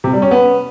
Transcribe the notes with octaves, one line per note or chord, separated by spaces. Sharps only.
C3
G3
C#4
B3